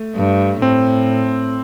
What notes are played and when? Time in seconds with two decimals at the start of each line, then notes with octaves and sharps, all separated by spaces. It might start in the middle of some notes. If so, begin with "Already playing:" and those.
Already playing: A3
0.16 G2
0.62 A2 C4